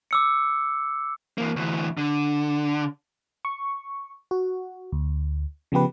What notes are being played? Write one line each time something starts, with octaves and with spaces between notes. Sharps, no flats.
D6 E6 C#7
E3 A#3
D2 E3
D3
C#6
F#4
D2
C#3 F3 B3 G4 B4